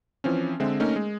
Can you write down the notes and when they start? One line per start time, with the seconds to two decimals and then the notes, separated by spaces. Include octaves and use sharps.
0.24 E3 F3 C4 C#4
0.60 D3 G#3 C4 E5
0.80 A3 A#3 C#4 D#4 A#4
0.96 G#3